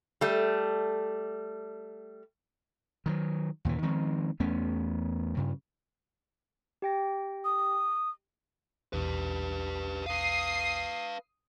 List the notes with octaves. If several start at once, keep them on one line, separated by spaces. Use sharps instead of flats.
G3 A3
D#3 E3 F#3
D#2 A#2 C#3 E3
D#3 F3 G#3 C4
E2 A3 B3 C#4
G2 C#3
G4 G5 A#6
D#6
A#1 E2 B2 G4 B4
B4 F5 D#6 C7